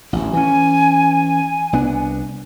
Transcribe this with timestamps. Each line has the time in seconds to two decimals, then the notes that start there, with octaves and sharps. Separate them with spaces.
0.13 A1 D2
0.33 E3 C#4 G#5
1.73 C2 B3 D4